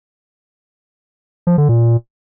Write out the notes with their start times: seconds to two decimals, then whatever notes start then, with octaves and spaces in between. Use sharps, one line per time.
1.47 F3
1.58 D3
1.69 A#2